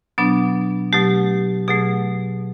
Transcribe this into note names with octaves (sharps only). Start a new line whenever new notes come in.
B2 F#3 B3 D4
B2 F#3 A3 G4
B2 F#3 A3 G#4